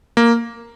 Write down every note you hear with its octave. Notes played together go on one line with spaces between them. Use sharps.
A#3